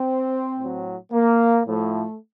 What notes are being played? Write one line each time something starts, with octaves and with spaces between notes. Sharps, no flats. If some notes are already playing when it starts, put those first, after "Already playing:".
Already playing: C4
A2 F#3
A#3
A2 F3 A3